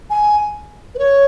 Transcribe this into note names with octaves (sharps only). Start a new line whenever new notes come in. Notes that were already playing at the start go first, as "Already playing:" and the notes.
G#5
B4
C#5